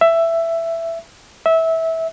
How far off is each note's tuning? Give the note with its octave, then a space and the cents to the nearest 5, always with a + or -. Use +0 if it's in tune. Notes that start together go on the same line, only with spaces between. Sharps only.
E5 +10
E5 -20